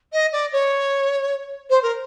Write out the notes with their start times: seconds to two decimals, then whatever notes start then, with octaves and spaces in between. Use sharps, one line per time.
0.12 D#5
0.32 D5
0.52 C#5
1.70 C5
1.82 A#4